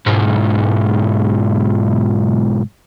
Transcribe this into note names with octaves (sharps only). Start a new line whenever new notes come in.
B1 G#2